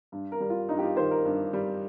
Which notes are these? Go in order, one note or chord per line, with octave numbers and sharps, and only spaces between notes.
G2
A#4
G3
F4
G2 D#4
G4
F4
D#3 C5
A#4
G2
G3